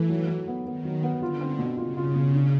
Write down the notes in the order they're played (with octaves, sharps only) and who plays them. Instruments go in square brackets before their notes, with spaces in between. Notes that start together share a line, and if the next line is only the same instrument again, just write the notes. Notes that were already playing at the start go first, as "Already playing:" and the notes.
Already playing: [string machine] E3 [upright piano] A3
[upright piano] F#3
F#3
B3
[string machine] D#3 [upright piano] B3
[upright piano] F#3
B3
[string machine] D3 [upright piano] F4
[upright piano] C4
B2
[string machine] C#3 [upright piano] F4
[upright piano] F4
B2
D4